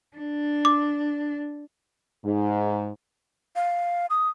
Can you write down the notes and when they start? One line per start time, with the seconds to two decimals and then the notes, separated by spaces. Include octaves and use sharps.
0.17 D4
0.65 D6
2.25 G#2
3.56 F5
4.10 D#6